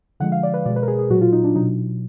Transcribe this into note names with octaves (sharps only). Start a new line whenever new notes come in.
D3 F3 G#3 F#5
F5
D5
B4
B2 G#3 D5
B4
A#4
G#4
G#4
A#2 F#3 F#4
F4
D#4
D4
B2 F#3 D#4